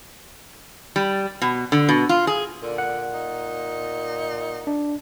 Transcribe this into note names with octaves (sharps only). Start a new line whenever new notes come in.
G3
B2
D3
B2
F4
G#4
A#2 D3
F#5
D#4
D4